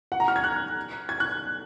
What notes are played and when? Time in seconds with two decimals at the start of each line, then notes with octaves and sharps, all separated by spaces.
0.12 F#5
0.20 A#5
0.28 F6
0.36 G#6
0.44 F#6
1.09 G#6
1.20 F#6